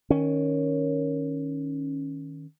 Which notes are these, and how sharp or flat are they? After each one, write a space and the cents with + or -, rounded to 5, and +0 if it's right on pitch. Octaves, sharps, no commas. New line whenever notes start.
D#3 +0 C#4 +0